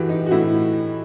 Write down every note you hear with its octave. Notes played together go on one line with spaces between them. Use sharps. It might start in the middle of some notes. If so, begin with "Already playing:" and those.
Already playing: A2 E3 F#4 G4
D#4
F#4
A2 E4